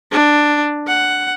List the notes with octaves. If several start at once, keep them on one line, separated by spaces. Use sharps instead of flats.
D4
F#5